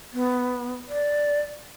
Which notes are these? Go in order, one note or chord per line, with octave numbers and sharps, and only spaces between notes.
B3
D5